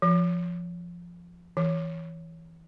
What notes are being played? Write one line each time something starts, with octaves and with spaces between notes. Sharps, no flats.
F3
E3